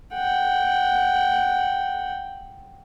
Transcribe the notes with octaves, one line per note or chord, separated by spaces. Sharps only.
F#5 G5